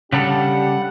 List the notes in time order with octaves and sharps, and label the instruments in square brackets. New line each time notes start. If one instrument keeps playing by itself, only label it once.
[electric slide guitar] C#3 G3 A4 [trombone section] D4 G4 [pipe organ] F#5